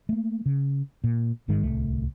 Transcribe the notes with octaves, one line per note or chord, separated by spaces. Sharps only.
A3 A#3
C#3
A#2
G1 G#2 D#3 G#3
D1 C2 A3